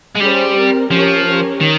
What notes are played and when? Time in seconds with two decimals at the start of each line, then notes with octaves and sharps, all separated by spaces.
0.16 G#3
0.21 G3 C#4 G#4 C5
0.56 C4 G4 A#4
0.90 F3 C#4 G4 A#4 C#5
1.26 C#4 G4 A#4 C#5
1.60 D#3